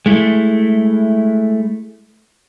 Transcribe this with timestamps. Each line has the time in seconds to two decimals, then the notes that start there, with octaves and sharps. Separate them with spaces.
0.06 G#3 A3 E4